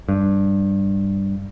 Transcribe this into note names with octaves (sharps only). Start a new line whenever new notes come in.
G2